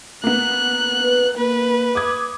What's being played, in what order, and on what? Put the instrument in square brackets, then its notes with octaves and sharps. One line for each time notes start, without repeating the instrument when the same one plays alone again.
[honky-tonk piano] A#3 B3 [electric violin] F#6
[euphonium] B4
[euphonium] A#3 [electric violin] B4
[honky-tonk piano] D6 D#6 G#6